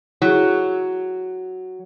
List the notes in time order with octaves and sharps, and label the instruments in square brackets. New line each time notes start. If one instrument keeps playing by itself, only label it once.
[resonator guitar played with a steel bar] F#3 [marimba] E4 G#4